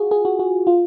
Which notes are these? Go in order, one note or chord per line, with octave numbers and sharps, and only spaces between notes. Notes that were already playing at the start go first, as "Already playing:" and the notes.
Already playing: F4 F#4 G#4
G#4
F#4
F#4
F4